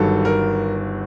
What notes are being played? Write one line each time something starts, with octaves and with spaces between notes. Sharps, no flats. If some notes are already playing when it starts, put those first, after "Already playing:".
Already playing: G1 G2 D#3 F#3 A4
A#4